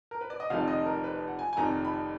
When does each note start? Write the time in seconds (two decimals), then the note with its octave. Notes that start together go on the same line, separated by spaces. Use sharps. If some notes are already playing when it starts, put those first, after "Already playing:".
0.11 A#4
0.21 B4
0.30 D5
0.40 D#5
0.50 F1 F2 D#3 F5
0.68 D#5
0.85 A#4
1.04 B4
1.28 F#5
1.39 G#5
1.53 G#5
1.57 F1 F2 D#3 A#5
1.85 B5